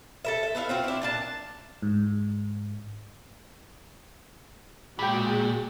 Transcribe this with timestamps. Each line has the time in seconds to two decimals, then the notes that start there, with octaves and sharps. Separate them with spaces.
0.25 A4 A#4 E5
0.43 E5
0.55 B3 D4 E4 F5
0.69 C4 F4 F#4
0.84 D4 E4
1.02 A#2 D4 A5
1.82 G#2
4.99 A#2 G#3 F#4 G#4 G5 B5